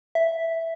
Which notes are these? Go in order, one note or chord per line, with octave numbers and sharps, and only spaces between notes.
E5